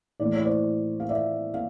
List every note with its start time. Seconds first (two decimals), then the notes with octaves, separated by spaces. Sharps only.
0.20 A2 E3 A3 D5
0.33 C#5
0.45 C5 D5
1.00 F5
1.09 D5 E5
1.54 F5